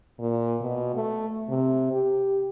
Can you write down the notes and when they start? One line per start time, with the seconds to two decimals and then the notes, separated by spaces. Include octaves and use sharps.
0.20 A#2
0.62 B2
0.95 A3
1.49 C3
1.93 G4